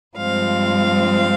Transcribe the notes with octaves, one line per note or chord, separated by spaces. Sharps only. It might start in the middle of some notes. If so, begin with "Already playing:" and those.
G2 F3 G#3 C4 F5